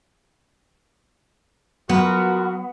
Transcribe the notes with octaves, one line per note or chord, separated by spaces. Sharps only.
F#3 B3 F4 F#4 A#4